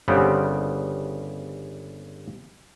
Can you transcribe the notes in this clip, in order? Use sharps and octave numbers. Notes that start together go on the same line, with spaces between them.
G1 C#3 G3 B3 C4 G4